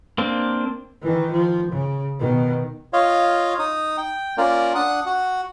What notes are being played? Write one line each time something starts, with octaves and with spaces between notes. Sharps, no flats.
A#3 C4 D4
D#3 E3
F3
C#3
B2 D#3
F4 C#5 D#5 F5
D#4 D#6
G5
A#3 C#4 F4 A#4 D5
D4 F#5 D#6 F#6
F#4 F#5